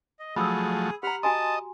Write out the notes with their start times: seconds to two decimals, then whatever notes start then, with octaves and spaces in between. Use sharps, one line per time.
0.19 D#5
0.36 F3 F#3 A3 G#4 B5 D#6 E6
1.03 G4 F#5 A#5 B5 F6
1.23 F#4 D#5 G#5 A5 C6